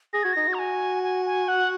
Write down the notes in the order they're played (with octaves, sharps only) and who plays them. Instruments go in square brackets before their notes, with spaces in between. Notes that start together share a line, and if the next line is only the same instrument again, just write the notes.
[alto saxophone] G#4 [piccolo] A#6
[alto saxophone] F#4 [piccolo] G#6
[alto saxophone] D#4 [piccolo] A#6
[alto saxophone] F#4
[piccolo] A#5
G#5
G#5
G#5
F#5